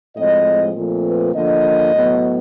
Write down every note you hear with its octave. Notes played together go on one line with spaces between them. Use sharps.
A2 F3 G#3 C4 D#5
A#2 F3 A3 C4
B4
D3 F3 A#3 D#5
A2 F#3 B3